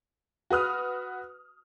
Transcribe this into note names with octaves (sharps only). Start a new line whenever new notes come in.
F#4 B4 D#6 F6